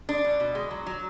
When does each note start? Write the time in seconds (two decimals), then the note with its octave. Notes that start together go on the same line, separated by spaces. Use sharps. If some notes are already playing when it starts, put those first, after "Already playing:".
0.09 G#3 D4
0.24 B2
0.40 B2
0.55 G#3
0.71 F#3
0.86 F#3